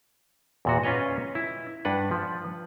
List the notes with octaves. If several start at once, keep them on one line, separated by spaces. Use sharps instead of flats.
E2 A#2 F#4
C#4 F4 B4 C#5 D#5
E4
G2 D4 B4 F#5
F3